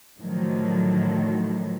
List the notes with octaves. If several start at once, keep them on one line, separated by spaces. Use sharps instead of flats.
A2 D3 D#3 F3 F#3